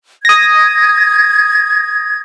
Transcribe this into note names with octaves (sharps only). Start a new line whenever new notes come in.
D#6 G#6 A#6